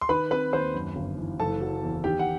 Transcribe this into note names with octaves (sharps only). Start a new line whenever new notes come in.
C6
D#3 B4 B5
C4 B4 B5
D#2 C5 C6
F#2
G1
E3
F#1 A4 A5
F#3
E2
D#3 G4 G5
F#5